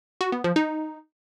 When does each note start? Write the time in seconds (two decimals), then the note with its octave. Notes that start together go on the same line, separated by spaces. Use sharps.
0.21 F#4
0.32 B3
0.44 F3
0.56 D#4